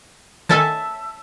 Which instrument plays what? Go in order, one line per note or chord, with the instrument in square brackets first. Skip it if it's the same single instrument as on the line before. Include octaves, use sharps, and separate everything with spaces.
[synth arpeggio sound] D#3 A4 G#5 [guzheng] E5 A5